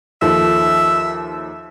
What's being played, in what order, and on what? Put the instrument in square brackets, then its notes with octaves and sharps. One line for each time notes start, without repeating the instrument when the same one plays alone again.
[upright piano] D#2 F3 A4 [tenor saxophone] E5